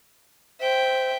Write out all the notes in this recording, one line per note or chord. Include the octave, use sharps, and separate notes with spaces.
C5 E5 G5